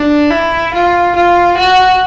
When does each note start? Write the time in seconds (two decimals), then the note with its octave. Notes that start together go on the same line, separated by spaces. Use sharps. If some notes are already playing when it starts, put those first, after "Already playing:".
Already playing: D4
0.31 E4
0.74 F4
1.16 F4
1.58 F#4